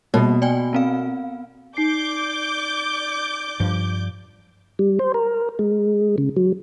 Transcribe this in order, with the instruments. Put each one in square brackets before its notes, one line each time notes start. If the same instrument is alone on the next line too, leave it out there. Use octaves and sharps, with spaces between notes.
[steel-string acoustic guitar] B2 [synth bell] G3 A#3
[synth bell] D5 G5 G#5
B3 C4 F5
[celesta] D#4 C7 [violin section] D5 D6 G6
[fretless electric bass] G2 F3
[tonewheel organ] G3
C5
A#4
G#3
C#3
F#3